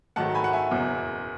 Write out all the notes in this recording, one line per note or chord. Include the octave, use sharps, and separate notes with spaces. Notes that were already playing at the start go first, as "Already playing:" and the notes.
G#2 D#3 F#3 A3 F#5 A5
G#5 B5
F#5
E5 G#5
F#1 E2 B2 F#3